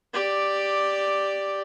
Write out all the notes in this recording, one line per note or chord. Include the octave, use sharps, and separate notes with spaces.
G4 D5